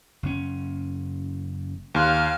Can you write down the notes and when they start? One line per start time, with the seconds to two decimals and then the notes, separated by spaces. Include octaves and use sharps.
0.23 F#1 C3 C#4
1.95 D#2 F5 C6 F#6